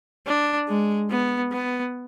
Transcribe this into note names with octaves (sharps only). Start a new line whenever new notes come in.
D4
G#3
B3
B3